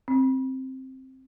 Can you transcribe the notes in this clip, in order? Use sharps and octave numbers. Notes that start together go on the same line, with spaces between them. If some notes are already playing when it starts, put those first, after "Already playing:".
C4